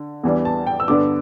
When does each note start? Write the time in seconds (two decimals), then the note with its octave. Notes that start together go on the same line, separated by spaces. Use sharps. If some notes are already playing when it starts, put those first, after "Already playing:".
Already playing: D3
0.24 E2 E3 G3 D4
0.45 A5
0.67 G5
0.80 E6
0.88 G2 D3 B3 D4 D6